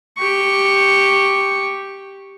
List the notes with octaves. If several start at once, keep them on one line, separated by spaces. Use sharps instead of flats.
G4 C#6